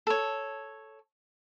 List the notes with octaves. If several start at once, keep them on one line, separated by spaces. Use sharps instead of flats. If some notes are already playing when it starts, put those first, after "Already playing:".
A4 C#5